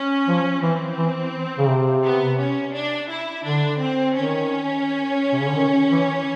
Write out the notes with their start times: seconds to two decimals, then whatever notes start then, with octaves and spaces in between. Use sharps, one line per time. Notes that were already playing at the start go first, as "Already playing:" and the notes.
Already playing: C#4
0.28 F3
0.62 E3 C4
0.98 E3
1.58 C#3
1.69 C3
2.05 B3
2.39 C#4
2.74 D4
3.09 E4
3.44 D3 D4
3.80 C4
4.15 D#3 C#4
5.33 C3
5.40 C#3
5.48 D3
5.56 D#3
5.92 E3